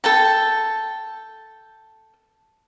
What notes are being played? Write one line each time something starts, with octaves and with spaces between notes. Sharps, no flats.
A4 G5 A5